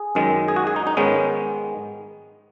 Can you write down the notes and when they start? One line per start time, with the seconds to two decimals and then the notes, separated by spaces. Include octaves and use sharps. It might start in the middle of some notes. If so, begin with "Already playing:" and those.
Already playing: G#4
0.15 F#2 D#3 G#3
0.48 G#4
0.56 F#4
0.67 G#4
0.76 D#4
0.87 D#4
0.97 G#2 D#3 G#3 B3 C#4